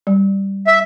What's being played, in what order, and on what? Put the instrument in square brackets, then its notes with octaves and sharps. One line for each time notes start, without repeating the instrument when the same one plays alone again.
[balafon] G3
[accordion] E5